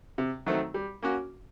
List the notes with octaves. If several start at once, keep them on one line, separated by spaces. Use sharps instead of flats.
C3
D#3 F#3 A3 C4
G3
A#3 C#4 F#4